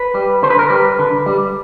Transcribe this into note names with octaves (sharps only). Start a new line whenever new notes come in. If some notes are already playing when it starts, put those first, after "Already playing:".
Already playing: B4
G3
D3 C5
B4
A#4
G3 B4
D3
G3